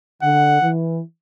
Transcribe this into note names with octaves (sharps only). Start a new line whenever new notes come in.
D3 F#5
E3